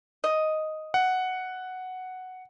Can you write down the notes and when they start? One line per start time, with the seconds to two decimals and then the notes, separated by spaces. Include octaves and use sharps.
0.24 D#5
0.94 F#5